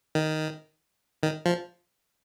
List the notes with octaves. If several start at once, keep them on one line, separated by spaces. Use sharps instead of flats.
D#3
D#3
F3